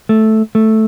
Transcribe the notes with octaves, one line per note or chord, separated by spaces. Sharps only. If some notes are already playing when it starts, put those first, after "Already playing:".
A3
A3